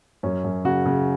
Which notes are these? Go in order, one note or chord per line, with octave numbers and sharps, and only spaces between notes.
F#2 C#4
F#2
C#3 F#4
C#3